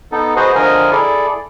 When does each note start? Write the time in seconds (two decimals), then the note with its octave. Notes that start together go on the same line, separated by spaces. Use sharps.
0.12 B3 D#4 A4
0.36 F#4 G#4 B4 C5 D#5
0.55 D3 F3 A#4 D#5 G#5
0.91 E4 G#4 A4 D5